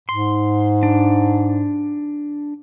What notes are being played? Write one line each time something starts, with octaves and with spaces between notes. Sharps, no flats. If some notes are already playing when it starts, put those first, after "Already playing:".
G#2 C6
D4